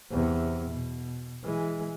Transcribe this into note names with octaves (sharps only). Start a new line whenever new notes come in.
E2 C3
B2
E3 G#3